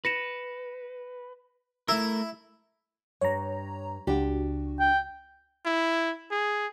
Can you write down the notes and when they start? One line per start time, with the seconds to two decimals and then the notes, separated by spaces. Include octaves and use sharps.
0.05 B4 A#6 C#7 E7
1.88 A3 E4 A#4 E6
3.21 G2 C#5 A#5
4.07 C#2 D4 F#4 G4
4.80 G5
5.65 E4
6.31 G#4